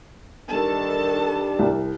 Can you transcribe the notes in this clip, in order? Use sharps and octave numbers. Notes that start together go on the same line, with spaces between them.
D#3 G3 D4 A4 A5
C2